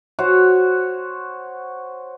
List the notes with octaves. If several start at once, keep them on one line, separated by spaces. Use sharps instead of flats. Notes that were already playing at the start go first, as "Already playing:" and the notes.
F#4 C5 C#5